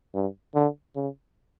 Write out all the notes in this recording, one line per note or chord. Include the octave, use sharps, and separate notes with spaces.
G2
D3
C#3